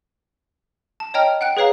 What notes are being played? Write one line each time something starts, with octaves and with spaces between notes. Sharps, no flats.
A5
C#5 D#5 G5 A#5 F6
F#5 G5 F#6
G#4 B4 C#5 F5 A#5